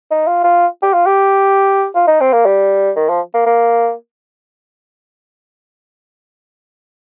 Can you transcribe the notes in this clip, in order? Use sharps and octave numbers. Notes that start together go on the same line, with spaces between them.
D#4
F4
F4
G4
F4
G4
F4
D#4
C4
A#3
G3
D#3
F3
A#3
A#3